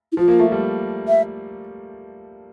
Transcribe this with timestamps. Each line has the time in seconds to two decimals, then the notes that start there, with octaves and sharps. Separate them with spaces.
0.12 E4
0.17 F3 F4
0.28 A#3
0.39 A3
0.52 G3
1.08 E5